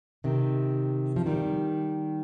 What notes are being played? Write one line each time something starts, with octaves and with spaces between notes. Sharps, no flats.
C3 D#3
F3
D#3 G3